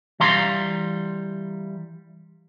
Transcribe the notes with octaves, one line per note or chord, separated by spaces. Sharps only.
E3 G3 F5 A#5 C6